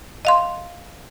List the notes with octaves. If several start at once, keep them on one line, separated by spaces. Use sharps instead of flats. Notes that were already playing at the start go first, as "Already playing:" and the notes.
D#5 F5 C6